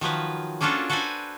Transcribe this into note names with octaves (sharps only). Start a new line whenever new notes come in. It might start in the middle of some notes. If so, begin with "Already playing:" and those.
D#3 F3 F#3 B4
A#3 C#4 D4 F4 F#4 A4
F#4 A4 B4 C5 D5 G#5